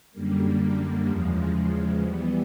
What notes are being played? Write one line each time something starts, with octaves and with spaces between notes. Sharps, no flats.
F#2 D3 G3 A#3
E2 C#3 F3 G#3
E3 G3 B3